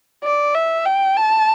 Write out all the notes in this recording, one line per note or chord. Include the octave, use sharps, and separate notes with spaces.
D5
E5
G5
A5